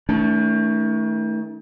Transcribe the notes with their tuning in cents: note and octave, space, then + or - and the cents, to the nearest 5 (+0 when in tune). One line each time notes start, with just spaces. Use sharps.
D#3 +40 A3 +0 D4 -45